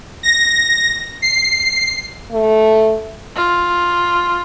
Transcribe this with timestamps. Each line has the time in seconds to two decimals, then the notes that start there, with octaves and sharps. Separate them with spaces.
0.23 A#6
1.22 C7
2.32 A3
3.36 F4